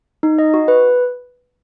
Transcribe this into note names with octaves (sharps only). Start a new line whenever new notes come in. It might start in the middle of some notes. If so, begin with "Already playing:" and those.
D#4
D#5
F#4
B4